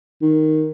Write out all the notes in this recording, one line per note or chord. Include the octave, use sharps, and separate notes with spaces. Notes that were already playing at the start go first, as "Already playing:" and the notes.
D#3